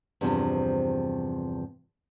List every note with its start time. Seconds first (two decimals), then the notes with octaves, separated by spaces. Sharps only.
0.21 E2 G2 C3 F3